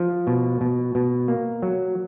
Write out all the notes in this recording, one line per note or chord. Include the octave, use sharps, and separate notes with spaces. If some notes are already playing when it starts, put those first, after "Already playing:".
Already playing: F3
B2
B2
B2
A#3
F#3